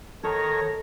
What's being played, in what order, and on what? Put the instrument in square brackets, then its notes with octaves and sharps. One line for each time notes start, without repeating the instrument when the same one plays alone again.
[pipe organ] D#3 C#5 A#6 [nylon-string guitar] A4